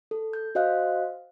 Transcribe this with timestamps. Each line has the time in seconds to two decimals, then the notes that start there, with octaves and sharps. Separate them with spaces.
0.11 A4
0.33 G6
0.55 F#4 C5 D#5 F5 F#6